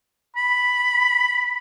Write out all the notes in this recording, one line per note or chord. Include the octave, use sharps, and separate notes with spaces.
B5